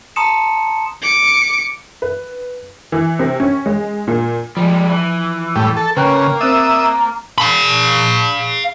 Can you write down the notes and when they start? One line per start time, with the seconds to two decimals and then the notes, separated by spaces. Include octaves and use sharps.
0.16 A5 A#5 C6 D#6 C#7 E7
1.03 D6 C#7
2.02 B4
2.92 E3
3.19 C3
3.40 C#4
3.66 G#3
4.07 A#2
4.57 F3 G3 G#3
4.90 E3
5.56 A2 G3
5.77 A4
5.97 C#3 A#3 B4 G5 F#6
6.41 C4 E5 D#6 F#6 A6
7.38 F5 B5